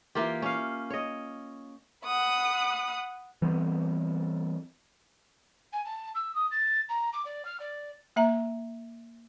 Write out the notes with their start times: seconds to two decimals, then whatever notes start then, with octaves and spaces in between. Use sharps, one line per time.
0.15 E3 A#3 F4 G4
0.42 C#4 F5
0.90 C#5 D#5
2.05 F#5 B5 D#6
3.42 E3 G3 B3 C4
5.72 G#5
5.85 A5
6.15 E6
6.35 D#6
6.51 A6
6.89 A#5
7.13 D6
7.25 D5
7.45 F6
7.60 D5
8.16 A#3 E5 A#5